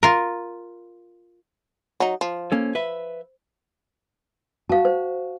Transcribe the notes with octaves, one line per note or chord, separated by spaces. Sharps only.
F4 A#4
F#3 D#4
F3
A#3 C#4 A4
B4 E5
F#4 F5 A5
C5